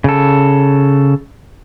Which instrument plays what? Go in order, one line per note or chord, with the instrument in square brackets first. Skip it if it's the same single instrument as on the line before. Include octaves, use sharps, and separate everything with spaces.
[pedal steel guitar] C#3 A4